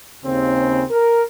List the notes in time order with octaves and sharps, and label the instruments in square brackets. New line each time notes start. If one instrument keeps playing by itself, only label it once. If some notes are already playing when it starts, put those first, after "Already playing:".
[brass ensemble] D#2 C#3 C4
A#4